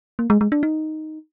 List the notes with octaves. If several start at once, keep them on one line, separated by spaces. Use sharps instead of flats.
A#3
G#3
G#3
D4
D#4